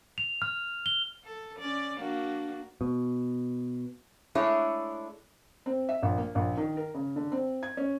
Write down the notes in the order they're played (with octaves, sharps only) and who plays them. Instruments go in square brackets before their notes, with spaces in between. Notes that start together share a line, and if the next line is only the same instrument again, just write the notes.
[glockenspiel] F7
F6
G7
[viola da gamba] A4
C#4 D5
A#3 D4 F#4
[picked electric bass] B2
[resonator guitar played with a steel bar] G#3 A3 D4 E4 G#4 C#5
[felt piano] C4
E5
A#1
A#3
A#1
D#3
A#4
C#3
D3
C4
G#6
C#4